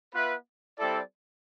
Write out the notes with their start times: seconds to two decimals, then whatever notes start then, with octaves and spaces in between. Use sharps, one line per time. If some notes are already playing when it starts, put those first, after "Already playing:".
0.12 B3 F4 B4 E5
0.78 G3 C4 E4 A4 D5